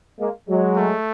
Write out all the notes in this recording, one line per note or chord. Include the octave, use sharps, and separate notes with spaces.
G#3 A#3
F#3 G#3
A3